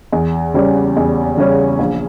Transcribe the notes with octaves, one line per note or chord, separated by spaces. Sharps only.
E2
C#3 G3 C#4
E2
C#3 G3 C#4
A#1